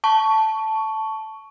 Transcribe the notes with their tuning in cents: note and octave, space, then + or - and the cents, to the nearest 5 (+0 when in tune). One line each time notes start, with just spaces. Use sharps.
A5 +0 C#6 +10